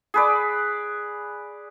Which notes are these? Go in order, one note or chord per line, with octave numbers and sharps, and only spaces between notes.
G#4 B4 D5